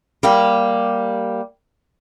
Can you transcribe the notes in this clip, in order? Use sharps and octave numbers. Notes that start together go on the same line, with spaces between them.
G3 A#3 G4